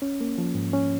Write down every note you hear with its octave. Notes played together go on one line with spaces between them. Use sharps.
C#4
A#3
F3
G#2
C#4